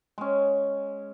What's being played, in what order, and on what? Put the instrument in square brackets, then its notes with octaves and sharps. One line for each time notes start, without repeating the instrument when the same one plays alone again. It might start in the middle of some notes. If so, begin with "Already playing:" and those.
[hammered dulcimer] G#3 C#4